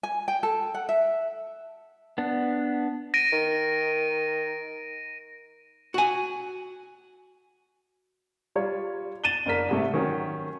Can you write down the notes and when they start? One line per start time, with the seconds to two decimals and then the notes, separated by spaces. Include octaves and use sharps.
0.03 G#5
0.28 G5
0.43 A4
0.74 F#5
0.89 E5
2.18 B3 D4
3.14 A#6 D7 D#7
3.32 D#3
5.94 F#4 G#5
8.56 G3 F4 C#5
9.24 A6 D#7 E7 F#7 G7
9.46 F#1 D4 A#4 B6
9.69 G#2 C3 A3
9.94 D#3 F#3 C#4